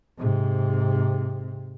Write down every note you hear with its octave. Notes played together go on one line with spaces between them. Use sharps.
G#2 C3